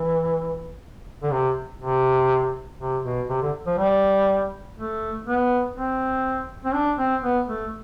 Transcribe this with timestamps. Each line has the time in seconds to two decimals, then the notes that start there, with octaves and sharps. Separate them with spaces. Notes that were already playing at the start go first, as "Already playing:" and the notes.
Already playing: E3
1.23 D3
1.32 C3
1.81 C3
2.80 C3
3.04 B2
3.29 C3
3.42 D3
3.67 F3
3.78 G3
4.78 A3
5.26 B3
5.76 C4
6.65 C4
6.74 D4
6.99 C4
7.23 B3
7.48 A3